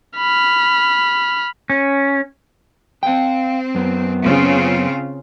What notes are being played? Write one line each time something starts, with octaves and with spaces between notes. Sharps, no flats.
B5 F6
C#4
C4 F5 G5
F#2 B3
C#3 C4 F4